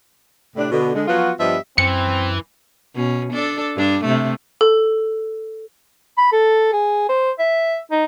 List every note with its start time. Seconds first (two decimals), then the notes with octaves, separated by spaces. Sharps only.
0.56 A2 C3 D4
0.70 B2 D3
0.95 D3 G#3
1.07 F3 F#3 B3 F4 F#4
1.40 G2 F3 G3 B3 D#5 E5
1.78 F#2 E3 C4 C#7
2.94 B2 C#4
3.33 D4 A4 D5
3.76 G2 D4
4.05 C3 A3
4.61 A4
6.18 B5
6.33 A4
6.73 G#4
7.09 C5
7.39 E5
7.91 D#4